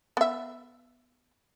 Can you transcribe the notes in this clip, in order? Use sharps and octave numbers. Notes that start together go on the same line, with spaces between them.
B3 E5